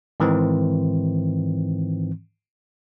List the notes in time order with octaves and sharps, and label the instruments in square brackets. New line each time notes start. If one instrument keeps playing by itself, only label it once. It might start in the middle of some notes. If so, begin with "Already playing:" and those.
[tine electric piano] G#2 D#3 E3 C4